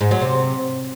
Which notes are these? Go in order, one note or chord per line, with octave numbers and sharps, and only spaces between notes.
G#2
F#3
C3